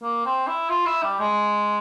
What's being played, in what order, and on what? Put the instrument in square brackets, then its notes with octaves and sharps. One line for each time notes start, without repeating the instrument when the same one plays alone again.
[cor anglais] A#3
C4
E4
F4
E4
G3
G#3